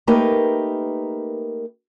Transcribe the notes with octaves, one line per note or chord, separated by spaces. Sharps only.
A3 A#3 D#4 G4 A#4 B4